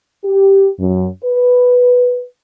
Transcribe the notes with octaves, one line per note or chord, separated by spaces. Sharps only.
G4
F#2
B4